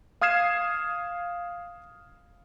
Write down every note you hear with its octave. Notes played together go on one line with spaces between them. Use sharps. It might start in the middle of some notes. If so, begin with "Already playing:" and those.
F5 D#6 F6 G#6 C7 E7